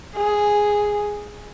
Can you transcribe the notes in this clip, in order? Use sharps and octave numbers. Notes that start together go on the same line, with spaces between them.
G#4